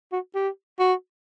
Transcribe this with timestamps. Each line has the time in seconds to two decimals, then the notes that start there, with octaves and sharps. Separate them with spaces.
0.12 F#4
0.35 G4
0.79 F#4